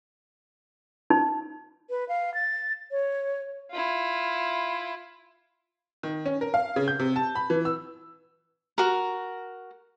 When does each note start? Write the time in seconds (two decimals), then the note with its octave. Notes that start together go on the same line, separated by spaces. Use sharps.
1.10 D#4
1.90 B4
2.09 F5
2.34 A6
2.91 C#5
3.71 E4 F4
6.03 D#3
6.26 C#4
6.41 A#4
6.54 F5
6.76 C#3
6.88 G6
6.99 C3
7.16 A5
7.35 B5
7.50 E3
7.65 E6
8.78 F#4 A#4